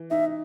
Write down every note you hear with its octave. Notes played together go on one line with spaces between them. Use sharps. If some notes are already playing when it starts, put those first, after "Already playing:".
Already playing: E3
D#4 E5